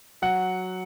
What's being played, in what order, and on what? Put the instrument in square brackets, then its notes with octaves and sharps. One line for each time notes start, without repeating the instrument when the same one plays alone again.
[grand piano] F#3 F#5